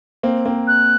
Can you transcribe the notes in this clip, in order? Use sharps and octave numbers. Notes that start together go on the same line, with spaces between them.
A#3 C4
A#3 C4
F#6